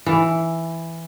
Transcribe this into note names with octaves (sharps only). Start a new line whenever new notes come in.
E3